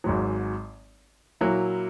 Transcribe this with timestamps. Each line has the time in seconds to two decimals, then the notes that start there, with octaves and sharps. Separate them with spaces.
0.04 G#1 G#2 F#3
1.41 A#2 F#3 A#3 E4